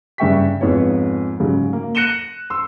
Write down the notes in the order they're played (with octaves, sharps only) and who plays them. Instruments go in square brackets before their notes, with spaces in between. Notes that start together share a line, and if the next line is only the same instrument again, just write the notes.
[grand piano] G2 C#3 E5 G5 C#6 B6
F2 G#2 B3 C#5
G#2 C#3 F#3
A#3
F#6 A#6 C#7 D#7 E7 G7
C6 E6